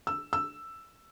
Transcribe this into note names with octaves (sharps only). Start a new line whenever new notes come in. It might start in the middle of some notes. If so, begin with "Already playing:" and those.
E6
E6